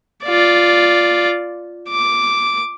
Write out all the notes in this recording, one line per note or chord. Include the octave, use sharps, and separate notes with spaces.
F4 D5
D6